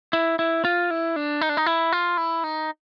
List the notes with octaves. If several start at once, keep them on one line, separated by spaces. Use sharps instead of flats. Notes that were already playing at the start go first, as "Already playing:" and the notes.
E4
E4
F4
E4
D4
D#4
D4
D#4
E4
F4
E4
D#4